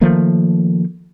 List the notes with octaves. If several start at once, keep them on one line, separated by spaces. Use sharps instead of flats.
D#3 F3 A3 A#3